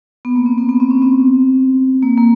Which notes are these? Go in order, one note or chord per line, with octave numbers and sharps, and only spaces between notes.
B3
A#3
C4
B3
B3
C4
C#4
C4
A#3
A#3